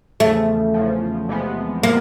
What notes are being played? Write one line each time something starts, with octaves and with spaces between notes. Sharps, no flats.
E2 C#3 F3 A3
E2 C#3 F3
E2 C3 F3 G#3 B3
C3 F3 G#3 A#3 B3